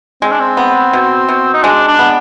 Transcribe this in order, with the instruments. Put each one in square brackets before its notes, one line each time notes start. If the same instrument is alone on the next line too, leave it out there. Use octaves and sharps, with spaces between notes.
[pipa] G#3 [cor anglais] C4
[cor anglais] D4
C4
[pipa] B3
B2
B2
[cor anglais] D#4
[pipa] G#3 [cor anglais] D4
[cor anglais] D4
[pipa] B3